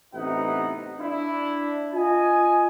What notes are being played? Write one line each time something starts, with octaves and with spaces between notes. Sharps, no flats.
A1 C3 B3 D#4 E4 F#5
D4 E4
F4 D#5 G#5